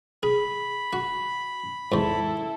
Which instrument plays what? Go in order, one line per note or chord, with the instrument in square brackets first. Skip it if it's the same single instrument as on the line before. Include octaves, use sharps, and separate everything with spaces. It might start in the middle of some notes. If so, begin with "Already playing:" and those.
[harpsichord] G#4 [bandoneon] B5
[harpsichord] F#4
[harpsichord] E2 G#2 [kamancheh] E4 A4